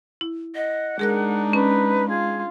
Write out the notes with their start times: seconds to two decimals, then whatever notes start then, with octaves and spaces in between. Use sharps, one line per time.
0.21 E4
0.55 D#5 F#5
0.99 G#3 D4 D#4 G#4 A#4 F#6
1.53 C#4 B4
2.09 F4 G#4